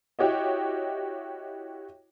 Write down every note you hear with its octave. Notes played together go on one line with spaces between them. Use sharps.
E4 F#4 G4 C#5 D#5